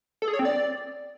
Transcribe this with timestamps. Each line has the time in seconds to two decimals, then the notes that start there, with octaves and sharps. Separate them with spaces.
0.22 A4
0.28 G#4
0.33 C#5
0.39 C4
0.45 D5